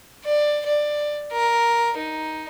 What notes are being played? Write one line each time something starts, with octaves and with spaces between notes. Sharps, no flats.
D5
D5
A#4
D#4